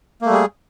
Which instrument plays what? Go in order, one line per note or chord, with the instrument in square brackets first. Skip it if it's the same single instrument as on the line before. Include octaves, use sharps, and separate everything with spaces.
[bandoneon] A#3
A3
G3
G#4